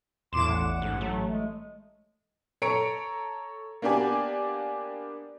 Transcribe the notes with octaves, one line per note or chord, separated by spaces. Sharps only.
E2 A2 C6 D6 E7
A1 F#5
G#2
F#3 A3
G#3
A4 C#5 A#5 C#7 D7
A#3 B3 D4 G4 D5 G#5